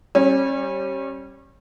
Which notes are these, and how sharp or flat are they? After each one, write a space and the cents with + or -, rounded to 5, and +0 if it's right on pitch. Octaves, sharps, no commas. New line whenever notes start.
G3 -10 C#4 -35